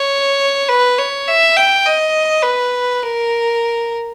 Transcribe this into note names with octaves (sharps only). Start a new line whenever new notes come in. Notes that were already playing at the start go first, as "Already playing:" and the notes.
Already playing: C#5
B4
C#5
E5
G5
D#5
B4
A#4